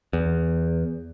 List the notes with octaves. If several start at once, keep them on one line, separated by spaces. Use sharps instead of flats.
E2